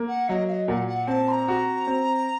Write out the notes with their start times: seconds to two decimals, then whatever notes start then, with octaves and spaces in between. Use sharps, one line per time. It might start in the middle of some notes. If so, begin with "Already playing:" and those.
Already playing: A#3
0.08 F#5
0.29 F#3 D#5
0.48 F5
0.52 D#5
0.68 A#2 F#5
0.88 F#5
1.07 C4 A5
1.28 C6
1.32 A#5
1.48 F#4
1.87 C4